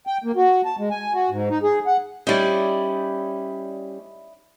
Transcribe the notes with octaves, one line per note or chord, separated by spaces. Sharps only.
G5
A#3
F#4
A5
G#3
G#5
F#4
G#2
D#4
G#4
F#5
G3 C#4 D#4 E4 D5